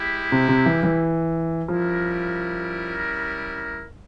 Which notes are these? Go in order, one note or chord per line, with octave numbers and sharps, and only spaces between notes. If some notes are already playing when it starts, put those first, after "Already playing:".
Already playing: G#3 E4 G4
C3
C3
E3
E3
F3 G3 C#4 E4 A#4